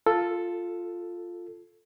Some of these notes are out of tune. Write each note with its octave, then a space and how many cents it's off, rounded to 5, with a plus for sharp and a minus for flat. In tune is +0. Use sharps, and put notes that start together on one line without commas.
F4 +0 A4 +0